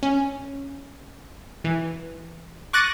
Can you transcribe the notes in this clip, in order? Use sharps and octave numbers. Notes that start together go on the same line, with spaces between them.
C#4
E3
C#6 D6 F#6 A6 A#6 D#7